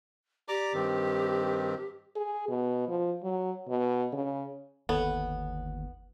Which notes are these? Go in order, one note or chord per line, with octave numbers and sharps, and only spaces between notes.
G4 D5 A#5 D6
G2 D#3 C4
G#4
B2
F3
F#3
B2
C#3
G1 D#2 B3 A4 C#5